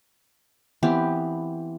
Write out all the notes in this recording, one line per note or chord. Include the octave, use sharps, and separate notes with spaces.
E3 B3 C4 G4